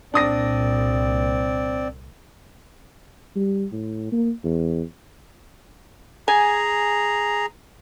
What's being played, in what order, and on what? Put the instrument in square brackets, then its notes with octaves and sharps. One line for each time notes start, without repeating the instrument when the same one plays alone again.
[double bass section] C2 A#2 [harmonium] C4 D5 [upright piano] D4 D#6 A#6
[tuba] G3
A2
A#3
E2
[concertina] G#4 A#5 [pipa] G#5